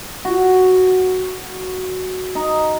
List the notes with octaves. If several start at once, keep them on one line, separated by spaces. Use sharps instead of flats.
F#4
D#4